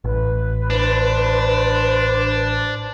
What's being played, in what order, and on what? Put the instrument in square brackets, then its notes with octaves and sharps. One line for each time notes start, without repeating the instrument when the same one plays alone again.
[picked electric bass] A1 [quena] B4
[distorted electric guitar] D4 [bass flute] C5